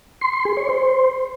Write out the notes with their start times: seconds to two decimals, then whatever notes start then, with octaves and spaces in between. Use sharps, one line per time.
0.21 C6
0.33 C6
0.45 G#4
0.57 C#5
0.69 C5